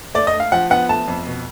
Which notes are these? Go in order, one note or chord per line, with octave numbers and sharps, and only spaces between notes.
A3 D5
D#5
A3
F5
F3 F#5
B3 F#5
A3 A5
F2
B2